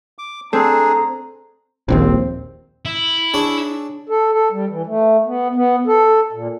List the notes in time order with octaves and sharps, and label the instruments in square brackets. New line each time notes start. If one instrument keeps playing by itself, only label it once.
[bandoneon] D6
[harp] C4 [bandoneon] D4 G#4 [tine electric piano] A4 [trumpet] A#5
[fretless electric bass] D#1 A#1 D#2 [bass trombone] C4
[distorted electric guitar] E4
[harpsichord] D4 G#4 C#5
[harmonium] A4
A4
G3
E3
A3
B3
B3
A4
A#2